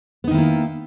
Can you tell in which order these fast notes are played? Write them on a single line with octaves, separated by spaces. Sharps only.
B3 D#4 D#3 E4 A#3